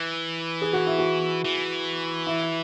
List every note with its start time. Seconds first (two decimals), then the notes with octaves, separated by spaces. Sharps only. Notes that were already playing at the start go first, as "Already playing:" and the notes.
Already playing: E3
0.62 G#4
0.73 F#4
0.87 E4
0.99 F#4
1.45 E3
2.27 E4